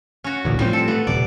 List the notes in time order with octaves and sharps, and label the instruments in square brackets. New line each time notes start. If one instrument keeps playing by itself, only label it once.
[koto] C#4 F#4
[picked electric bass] A1 D2 A2
[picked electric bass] A2 F3 C4 [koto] G3 C5
[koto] A4
[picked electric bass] A3 [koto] B3
[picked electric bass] D#1 C3 [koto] D5